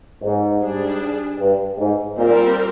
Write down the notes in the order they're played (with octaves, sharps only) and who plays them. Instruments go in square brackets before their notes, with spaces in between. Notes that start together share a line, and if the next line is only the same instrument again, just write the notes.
[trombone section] G#2
[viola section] G3 D4 G#4
[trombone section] G2
G#2
[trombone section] A#2 [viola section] G3 C4 G4 A#4